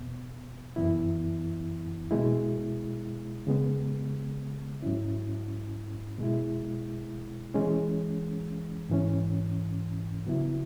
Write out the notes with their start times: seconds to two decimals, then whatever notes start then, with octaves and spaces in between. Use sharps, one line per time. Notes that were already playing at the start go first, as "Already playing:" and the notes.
Already playing: E2 B2 B3
0.76 F#2 E3 B3 E4
2.11 B2 G#3 E4
3.47 C#3 G#3 B3
4.82 G#2 F#3 C#4 E4
6.18 B2 G#3 E4
7.54 E3 G#3 C#4
8.90 G#2 E3 C#4
10.26 C#3 F#3 B3 E4